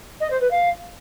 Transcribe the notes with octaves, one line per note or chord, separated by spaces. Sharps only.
D#5
C5
B4
F5